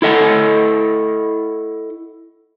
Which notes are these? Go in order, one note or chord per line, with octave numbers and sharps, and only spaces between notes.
E4 A4 D#5 F#5